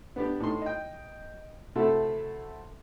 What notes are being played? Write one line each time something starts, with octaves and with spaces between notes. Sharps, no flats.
B3 D4 G4
A2 D#4 C6
D#5 G5
C3 A3 C4 E4 F#4 A4